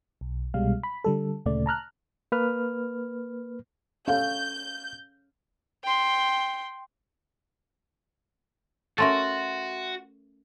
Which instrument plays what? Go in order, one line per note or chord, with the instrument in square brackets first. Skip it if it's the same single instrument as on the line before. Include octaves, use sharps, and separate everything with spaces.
[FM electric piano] B1
C2 B2 G3 G#3 F5
B5
D3 G3 A4
D2 A#2 C#3 A3 D5
A5 A#5 F6 F#6
[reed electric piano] A#3 B4 F6
[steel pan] C#4 A4 [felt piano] F5 [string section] G6
[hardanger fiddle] G5 C6
[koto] A3 C#4 A#4 [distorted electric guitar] F#4 [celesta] E5 C6 A6